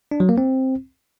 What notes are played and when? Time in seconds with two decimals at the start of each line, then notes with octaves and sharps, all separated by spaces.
0.11 D4
0.20 F#3
0.29 A#3
0.38 C4